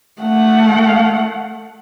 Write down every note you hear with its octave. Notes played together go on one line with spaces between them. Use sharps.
A3 F#5